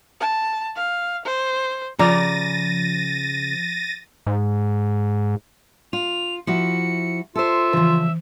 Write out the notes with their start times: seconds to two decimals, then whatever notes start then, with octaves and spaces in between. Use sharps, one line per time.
0.20 A5
0.76 F5
1.25 C5
1.99 C#3 F3 D5 A#5 A6 A#6 D#7
4.27 G#2
5.93 F4 F7
6.47 F3 E4 F#4 C#7
7.36 F4 A4 C5 E5
7.73 C#3 E3 F3